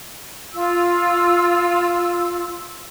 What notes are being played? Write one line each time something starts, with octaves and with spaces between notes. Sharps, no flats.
F4 E6